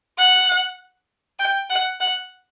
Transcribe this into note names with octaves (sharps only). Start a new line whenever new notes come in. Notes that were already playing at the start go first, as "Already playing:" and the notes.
F#5
G5
F#5
F#5